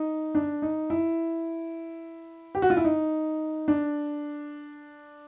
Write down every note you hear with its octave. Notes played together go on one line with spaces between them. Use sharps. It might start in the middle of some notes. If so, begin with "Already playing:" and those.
Already playing: D#4
D4
D#4
E4
G4
F#4
F4
E4
D#4
D4